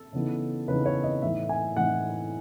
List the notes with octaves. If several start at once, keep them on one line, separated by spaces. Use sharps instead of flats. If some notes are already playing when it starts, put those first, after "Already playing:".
Already playing: A4
C#3 E3 B3 D#4
C#3 E3 B3 D#4 B4
C#5
D#5
A2 E3 A3 D#4 E5
G#5
A2 E3 A3 D#4 F#5